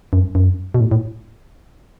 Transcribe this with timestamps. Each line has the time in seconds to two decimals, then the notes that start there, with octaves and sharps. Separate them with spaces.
0.13 F#2
0.35 F#2
0.74 B2
0.80 A2
0.91 A2